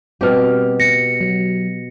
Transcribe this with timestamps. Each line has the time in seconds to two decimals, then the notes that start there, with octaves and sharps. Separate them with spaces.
0.21 B2 G3 C4 G4 F6
0.80 A#6 C#7
1.21 F#3